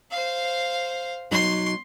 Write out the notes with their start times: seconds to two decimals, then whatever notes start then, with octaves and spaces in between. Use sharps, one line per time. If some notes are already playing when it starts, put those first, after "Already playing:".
0.11 C5 F5
1.31 B2 F#3 D#4 C6